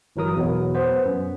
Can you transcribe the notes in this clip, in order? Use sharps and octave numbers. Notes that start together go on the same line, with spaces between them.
G1 E3 F#3 A#4 D#6
E2 B2 F#3 B3
B3 C5
F#2